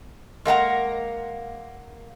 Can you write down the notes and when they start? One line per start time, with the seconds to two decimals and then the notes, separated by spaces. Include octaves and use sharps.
0.45 G#3 A#3 F#5 A#5